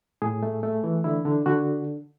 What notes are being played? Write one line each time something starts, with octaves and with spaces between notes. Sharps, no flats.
A2 G#4
A3
A3
E3
D3 E4
D3
D3 F#4